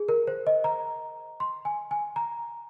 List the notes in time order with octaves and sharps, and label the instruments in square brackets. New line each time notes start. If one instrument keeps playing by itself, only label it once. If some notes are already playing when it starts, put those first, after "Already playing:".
Already playing: [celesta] G#4
A#4
C5
D#5
A#5
C6
G#5
G#5
A#5